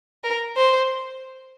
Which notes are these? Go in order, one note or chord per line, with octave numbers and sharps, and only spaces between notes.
A#4
C5